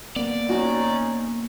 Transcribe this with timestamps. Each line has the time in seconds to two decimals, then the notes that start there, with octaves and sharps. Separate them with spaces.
0.16 A#3 B3 D5
0.49 C#4 D#4 F#4